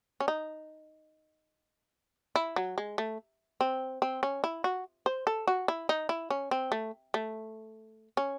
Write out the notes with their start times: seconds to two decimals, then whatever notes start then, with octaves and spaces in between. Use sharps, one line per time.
0.20 C#4
0.28 D#4
2.36 E4
2.56 F#3
2.78 G#3
2.98 A3
3.61 C4
4.02 C4
4.23 C#4
4.44 E4
4.64 F#4
5.06 C5
5.27 A4
5.47 F#4
5.68 E4
5.89 D#4
6.09 E4
6.30 C#4
6.51 C4
6.72 A3
7.14 A3
8.17 C#4